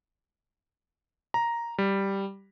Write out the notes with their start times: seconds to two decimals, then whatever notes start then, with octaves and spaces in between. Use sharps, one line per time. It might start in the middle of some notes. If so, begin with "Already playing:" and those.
1.34 A#5
1.78 G3